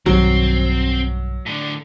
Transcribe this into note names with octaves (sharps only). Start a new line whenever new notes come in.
B1 G2 D#3 F#3 C4
A2 D3